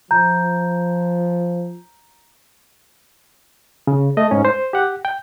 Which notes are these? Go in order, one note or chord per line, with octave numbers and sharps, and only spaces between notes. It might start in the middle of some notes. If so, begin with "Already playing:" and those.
F3 A#5 G6
C#3
A3 D#5
G#2 C#4
C5
G4 F#5
G5